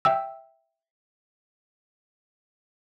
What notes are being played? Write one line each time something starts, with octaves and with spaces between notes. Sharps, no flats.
E5 G5 E6